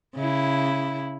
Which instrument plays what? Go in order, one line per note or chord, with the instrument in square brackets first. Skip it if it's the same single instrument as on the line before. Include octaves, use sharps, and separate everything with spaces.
[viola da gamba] C#3 E4